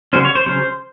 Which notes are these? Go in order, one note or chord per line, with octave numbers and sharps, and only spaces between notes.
C#3 F#3 C#4 C5
C#5
C5
C#3 F#3 C#4 C5